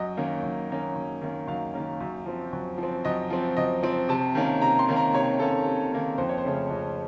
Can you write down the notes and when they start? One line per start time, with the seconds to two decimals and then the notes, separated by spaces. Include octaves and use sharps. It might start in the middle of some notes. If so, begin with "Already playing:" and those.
Already playing: F#2 D#5
0.17 D#3 A#3 C#4
0.43 F#2
0.70 D#3 A#3 C#4
0.95 F#2
1.21 D#3 A#3 C#4
1.47 F#2 F5
1.74 D#3 A#3 C#4
2.00 F#2
2.26 F3 C4
2.53 F#2
2.78 F3
2.83 C4
3.05 F#2 D#5
3.30 F3 C4
3.57 F#2 D#5
3.83 F3 C4
4.09 C3 A5
4.35 D#3 A#3 C#4
4.62 C3 A#5
4.79 C6
4.88 D#3 A#3 C#4
4.96 A#5
5.14 C3 C#5
5.40 D#3 A#3 C#4 A4
5.66 C3
5.92 D#3 A#3 C#4
6.18 F2 C5
6.29 C#5
6.38 C5
6.45 C#3 A3 C#4
6.70 F2 C#5